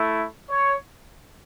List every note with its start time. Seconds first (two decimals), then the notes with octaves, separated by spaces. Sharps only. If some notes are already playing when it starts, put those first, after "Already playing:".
Already playing: A3 E4
0.50 C#5